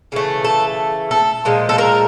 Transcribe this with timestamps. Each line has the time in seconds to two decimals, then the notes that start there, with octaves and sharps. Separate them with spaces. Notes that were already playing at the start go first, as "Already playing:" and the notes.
0.12 C#3 E3 A3
0.44 A4
1.11 A4
1.45 A#2 F3 G#3
1.69 A4
1.78 A#4